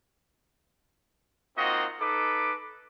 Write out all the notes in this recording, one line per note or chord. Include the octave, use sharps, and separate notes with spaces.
A#3 C4 D#4 F4 F#4 D#5
D#4 A4 B4 D6